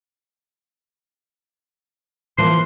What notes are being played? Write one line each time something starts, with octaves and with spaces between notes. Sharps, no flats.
E3 F3 A#3 C6